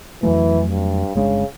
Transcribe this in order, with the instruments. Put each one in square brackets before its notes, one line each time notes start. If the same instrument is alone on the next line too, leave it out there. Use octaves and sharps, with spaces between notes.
[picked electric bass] F2 F#3 A3 [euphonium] E3
[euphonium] G2
[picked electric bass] G1 G#3 D4 [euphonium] C#3